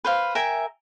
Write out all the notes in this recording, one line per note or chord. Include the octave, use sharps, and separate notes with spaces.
B4 C5 F5
A#4 E5 G5 G#5